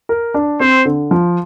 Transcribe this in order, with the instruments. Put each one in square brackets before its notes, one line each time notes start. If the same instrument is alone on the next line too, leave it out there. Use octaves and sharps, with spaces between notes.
[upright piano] A#4
D4
[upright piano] C4 [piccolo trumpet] C5
[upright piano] D3
F3